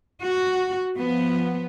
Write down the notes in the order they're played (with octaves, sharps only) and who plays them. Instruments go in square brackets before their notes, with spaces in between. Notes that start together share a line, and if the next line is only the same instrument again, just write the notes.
[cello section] F#4
F3 B3